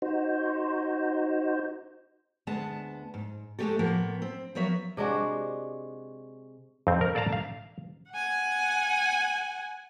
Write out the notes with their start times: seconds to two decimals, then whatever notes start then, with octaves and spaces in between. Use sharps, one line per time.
0.02 D#4 F#4 C5
2.47 D2 G#3 B3 A5
3.14 G#2
3.59 G#3 A3 C4 C#4 G4 A4
3.79 A2 F3 A#3 B3
4.22 C4
4.55 F3 F#3 B3 A#4 C#5 E5
4.97 C3 G#3 D4 F#4
6.87 F2 C4
7.01 A#4
7.15 A4 D5 F5 A5 A#5
7.32 F5
8.11 F#5 G#5